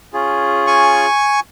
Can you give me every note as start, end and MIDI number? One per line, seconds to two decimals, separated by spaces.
0.13 1.06 61
0.13 1.06 65
0.13 1.06 68
0.67 1.40 80
0.67 1.40 85